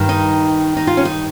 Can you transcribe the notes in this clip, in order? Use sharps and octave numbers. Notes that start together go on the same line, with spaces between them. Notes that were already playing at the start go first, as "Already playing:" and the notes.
Already playing: G2 D#3
D#4
D#4
F4
C#4
D#4